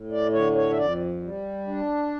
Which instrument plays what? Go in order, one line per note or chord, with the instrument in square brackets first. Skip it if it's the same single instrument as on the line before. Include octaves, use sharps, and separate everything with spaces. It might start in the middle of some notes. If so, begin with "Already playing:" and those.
Already playing: [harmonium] A2
D5
D3 C#5
C#5
E5
F2 D5
G3
D4